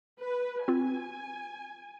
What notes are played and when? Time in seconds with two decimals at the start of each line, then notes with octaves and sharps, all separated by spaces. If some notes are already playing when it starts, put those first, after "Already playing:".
0.21 B4
0.68 C4 F4 G#5